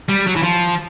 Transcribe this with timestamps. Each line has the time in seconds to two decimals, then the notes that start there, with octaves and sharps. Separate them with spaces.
0.09 G3
0.27 F#3
0.36 E3
0.43 F3